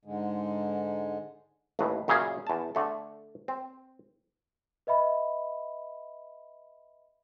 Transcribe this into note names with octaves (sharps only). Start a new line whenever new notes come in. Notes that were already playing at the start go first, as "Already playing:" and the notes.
G#2 D3 G#3
A1 D#2 A2 B4
F#2 A#2 C#3 C#4 G#4
E2 A5
D3 A3 A4
C4
B4 D#5 E5 B5